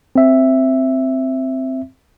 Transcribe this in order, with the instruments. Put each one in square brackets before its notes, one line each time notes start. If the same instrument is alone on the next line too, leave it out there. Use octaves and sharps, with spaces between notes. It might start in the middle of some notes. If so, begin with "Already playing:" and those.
[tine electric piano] C4 E5